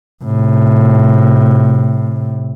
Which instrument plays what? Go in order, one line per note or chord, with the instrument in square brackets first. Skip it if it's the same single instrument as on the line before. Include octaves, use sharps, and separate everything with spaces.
[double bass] A2 C3